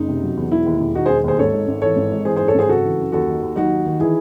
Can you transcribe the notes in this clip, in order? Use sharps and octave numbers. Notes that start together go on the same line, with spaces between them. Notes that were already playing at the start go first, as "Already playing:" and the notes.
Already playing: F#1 D#4
C3
F#3
E2
E1 E4
D#2
E1
D#3 D#4 F#4
E1 G#4 C5
D#2 G#4 C5
G#1 A4 C#5
G#2
G#1
E3 A4 C#5
G#1
G#2
E3 G#4 C5
F#2 G#4 C5
A4 C#5
G#1 G#4 C5
C#3 F#4 A4
E3
F#2
D#2 F#4 A4
D#3
D#2
F#3 D#4 F#4
D#2
D#3
E3 E4 G#4